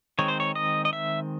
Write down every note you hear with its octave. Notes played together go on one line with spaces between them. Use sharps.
D#3 G#3 C4 C#5
C5
C#5
D#5
D#5
E5